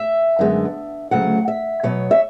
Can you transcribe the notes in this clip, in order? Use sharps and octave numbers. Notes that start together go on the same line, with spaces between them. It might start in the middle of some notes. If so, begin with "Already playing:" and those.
Already playing: E5
F#2 D3 G#3 B3
D2 C#3 F#3 A3 F#5
E5
B2 F#3 B3 C#5
E5